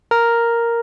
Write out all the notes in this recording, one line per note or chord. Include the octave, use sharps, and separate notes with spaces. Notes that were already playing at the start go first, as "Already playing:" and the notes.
A#4